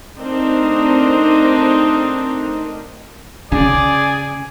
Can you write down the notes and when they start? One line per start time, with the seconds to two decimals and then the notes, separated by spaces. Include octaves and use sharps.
0.18 A3 C4 D4 D#4 A#4 D#5
3.52 C#3 G#4 D5